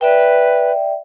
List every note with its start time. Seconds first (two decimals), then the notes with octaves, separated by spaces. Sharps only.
0.01 B4 D5 E5 G5